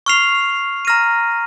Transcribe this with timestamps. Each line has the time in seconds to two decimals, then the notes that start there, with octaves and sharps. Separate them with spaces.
0.06 C#6 F6 C7 F7
0.85 A#5 F6 A#6 D#7